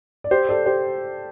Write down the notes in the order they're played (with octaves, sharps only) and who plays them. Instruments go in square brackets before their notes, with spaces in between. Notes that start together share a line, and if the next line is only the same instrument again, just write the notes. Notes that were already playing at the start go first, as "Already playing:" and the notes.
[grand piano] D5
G4 C5
A4 D5
G4 C5